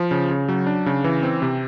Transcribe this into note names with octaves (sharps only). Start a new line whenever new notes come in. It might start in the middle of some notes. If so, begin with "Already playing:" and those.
Already playing: F3
C#3
C#3
F#3
D4
C#3
E3
C4
C3